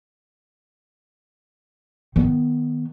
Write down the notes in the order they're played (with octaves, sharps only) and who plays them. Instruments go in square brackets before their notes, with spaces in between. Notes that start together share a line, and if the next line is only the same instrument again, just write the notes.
[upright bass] D#3 B3